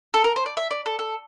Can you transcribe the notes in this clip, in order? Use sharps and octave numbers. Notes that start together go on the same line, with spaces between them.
A4
A#4
C5
D5
E5
D5
A4
A4